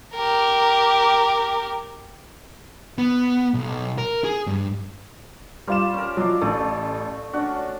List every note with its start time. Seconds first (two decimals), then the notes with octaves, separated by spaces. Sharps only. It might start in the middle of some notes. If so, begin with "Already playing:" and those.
0.15 G4 A#4
2.98 B3
3.54 B1
3.98 A#4
4.24 G#4
4.47 G2
5.67 G3 F4 A#4 C5 D5 E7
5.94 C#4 A#4
6.17 F3 F#3 D5 D#5 F5
6.41 A1 A3 A4
7.33 C#4 D4 F#4